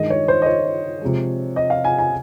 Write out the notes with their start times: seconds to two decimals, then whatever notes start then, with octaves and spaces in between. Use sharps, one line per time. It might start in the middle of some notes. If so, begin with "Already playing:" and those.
Already playing: G2 D#3 G#3 D#5
0.10 C#5
0.28 C5
0.42 D#5
0.46 C#5
1.01 C3 F3 G#3
1.56 D#5
1.70 F5
1.84 G#5
1.98 G#5